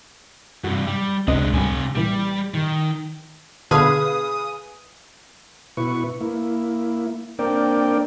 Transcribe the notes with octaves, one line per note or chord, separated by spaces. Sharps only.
G2 C3 F#4
G3
C#2 C3 G#3 D4 D#5
C#2 C3 G3 G#5
A#1 E3 G3
D#3
B2 D3 G#4 B4 F5 D#6
B2 E4 B4 C#6
A#3 E4
A#3 C4 D4 A#4 D5 G5